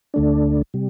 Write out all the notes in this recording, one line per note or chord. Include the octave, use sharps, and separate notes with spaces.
D2 D3 A3 D4
C3 G3